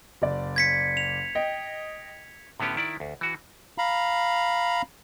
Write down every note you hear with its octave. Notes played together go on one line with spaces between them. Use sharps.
F#1 D5
G#6 B6 C#7
F7
D#5 G5
A2 D3 B3 C#4 G4
D#3 E4 D5
D2
E3 F#4
F5 A#5 B5